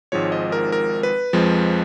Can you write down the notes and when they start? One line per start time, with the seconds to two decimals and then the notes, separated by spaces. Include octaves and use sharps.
0.12 G#1 G#2 F3 G#3 C#5
0.32 D#5
0.52 A#4
0.72 A#4
1.03 B4
1.33 F2 F3 G#3